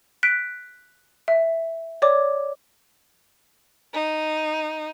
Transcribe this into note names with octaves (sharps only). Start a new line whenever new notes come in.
F#6 B6 D7
E5
C#5 D5 D6
D#4